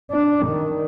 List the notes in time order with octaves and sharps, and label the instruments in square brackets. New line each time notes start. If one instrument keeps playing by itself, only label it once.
[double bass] D4
D#3